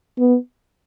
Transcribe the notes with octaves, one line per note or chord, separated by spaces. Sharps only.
B3